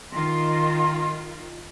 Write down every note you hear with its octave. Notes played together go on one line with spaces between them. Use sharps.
D#3 F4 C6